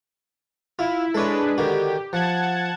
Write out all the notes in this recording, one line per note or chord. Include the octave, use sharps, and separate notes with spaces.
E4 F4
G#3 D4 A4 B4 C#5
D3 D#3 F#4 G4
F3 F#5 A5 G#6